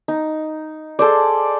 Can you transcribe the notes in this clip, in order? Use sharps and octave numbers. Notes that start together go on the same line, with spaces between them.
D#4
G#4 A4 C5 D5